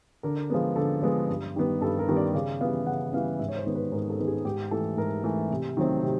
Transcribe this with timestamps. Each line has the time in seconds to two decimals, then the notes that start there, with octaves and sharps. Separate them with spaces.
0.23 D3 A#4
0.50 F3 G#3 B3
0.76 D3 A4
1.02 F3 G#3 B3
1.29 G2
1.56 D#3 G3 B3
1.81 G2 A4
1.99 A#4
2.08 D#3 G3 B3
2.17 D5
2.34 C#3 D5
2.61 E3 G3 B3 F5
2.87 C#3 F#5
3.13 E3 G3 B3 F5
3.39 G#2 E5
3.49 C#5
3.57 C5
3.66 D#3 G#3 B3
3.75 B4
3.92 G#2 A#4
4.10 A4
4.19 D#3 G#3 B3
4.28 G#4
4.45 G#2 G4
4.71 E3 A3 A4
4.97 G#2 A#4
5.24 E3 A3
5.51 C3
5.77 D#3 F#3 A3 C4
6.02 C3